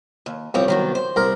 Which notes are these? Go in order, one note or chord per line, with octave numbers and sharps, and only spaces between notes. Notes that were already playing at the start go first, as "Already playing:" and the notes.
D#2
C2 F3 C4 C#5
D#3 F#3 B3
C5
C2 A#4